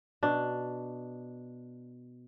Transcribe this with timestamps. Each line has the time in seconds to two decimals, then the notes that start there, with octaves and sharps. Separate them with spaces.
0.23 B2 D4